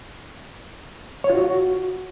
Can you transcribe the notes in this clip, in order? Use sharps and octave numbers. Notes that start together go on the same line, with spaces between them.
C#5
F4
F#4